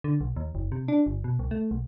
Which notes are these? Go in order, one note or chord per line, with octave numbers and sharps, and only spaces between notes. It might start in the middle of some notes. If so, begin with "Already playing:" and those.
D3
B1
D#2
F#1
C3
D4
G1
B2
C2
A3
B1